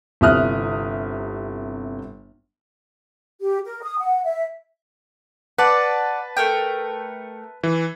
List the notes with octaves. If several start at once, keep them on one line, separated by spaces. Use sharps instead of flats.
G1 C3 E4 D#6 F6 F#6
G4
A#4
D#6
F#5
E5
B4 D5 F#5 A5
A3 A#4 G5
E3